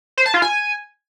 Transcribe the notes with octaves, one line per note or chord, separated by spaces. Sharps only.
C5
A5
F4
G#5